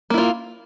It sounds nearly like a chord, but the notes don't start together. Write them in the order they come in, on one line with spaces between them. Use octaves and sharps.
A#3 E4 F4